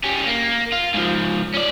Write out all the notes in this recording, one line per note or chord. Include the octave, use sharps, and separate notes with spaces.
G3 C#4
A#3
F4
G#2 F3
C#4 D5